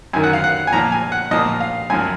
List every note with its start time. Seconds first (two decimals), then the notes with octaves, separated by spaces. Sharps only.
0.13 F#2 D#3 G#5
0.24 F#5
0.33 F5
0.44 F#5
0.67 G#5
0.72 A#2 F3 A#5
0.92 G#5
1.12 F#5
1.31 A#2 F3 D#5
1.60 F5
1.90 F#2 F3 G#5